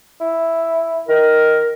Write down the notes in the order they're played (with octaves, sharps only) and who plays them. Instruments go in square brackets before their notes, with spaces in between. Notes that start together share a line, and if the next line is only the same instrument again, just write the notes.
[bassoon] E4
[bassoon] D#3 [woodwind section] A#4